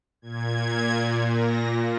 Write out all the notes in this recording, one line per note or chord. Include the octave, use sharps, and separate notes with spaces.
A#2 G#6
A#6